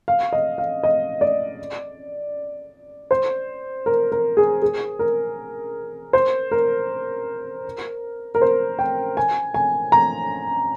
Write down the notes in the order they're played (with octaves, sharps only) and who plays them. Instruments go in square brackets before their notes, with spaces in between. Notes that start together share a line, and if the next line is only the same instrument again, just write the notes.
[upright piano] F5
D#5
F5
D#5
D5
C5
A#4
A#4
G#4
G#4
A#4
C5
A#4
A#4
C5
G5
G#5
G#5
A#5